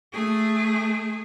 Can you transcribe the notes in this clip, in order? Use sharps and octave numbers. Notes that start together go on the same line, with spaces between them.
A3 G#4